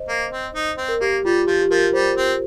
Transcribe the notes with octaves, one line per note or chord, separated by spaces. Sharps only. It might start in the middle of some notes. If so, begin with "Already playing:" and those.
Already playing: C5 D#5
A#3
C4
D#4
C4
A#4
A#3 G4
G3 F4
F3 G4
G4
F3 A#4
G3 C5
C4